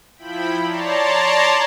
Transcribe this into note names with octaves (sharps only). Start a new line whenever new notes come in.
F3 E4 G5 B5
C#5 D5 A5 A#5 C6